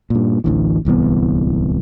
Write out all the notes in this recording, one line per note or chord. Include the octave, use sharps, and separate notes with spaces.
G2 A#2
A1 D2 E3
D1 C2 E3 B3